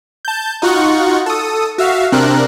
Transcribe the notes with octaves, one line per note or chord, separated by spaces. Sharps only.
A5 G6
D#4 F4 F#4 F#5 C#6
A4 D#6
F#4 E5 F5
C3 C4 D4 A#4 F#6